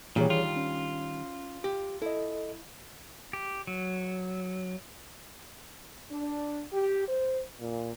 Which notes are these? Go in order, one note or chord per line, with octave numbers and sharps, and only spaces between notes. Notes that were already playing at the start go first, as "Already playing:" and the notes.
A#2 D#3 E3 G3 D4 G#4 C#5
F4
C#4
G4
E4 A4 D#5
G4
F#3
D4
G4
C5
A#2